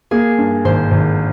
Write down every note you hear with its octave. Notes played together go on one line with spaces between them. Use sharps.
A#3 G#4
G2
G#1 C5
G#1